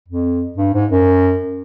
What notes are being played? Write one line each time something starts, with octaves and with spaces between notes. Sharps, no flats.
F2
G2
G#2
F#2